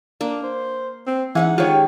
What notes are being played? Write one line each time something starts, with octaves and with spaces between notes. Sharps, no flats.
A#3 D4
C5
C4
E3 G#3 C#4 D#4 F#5
D#3 G#3 F4 G4 C#5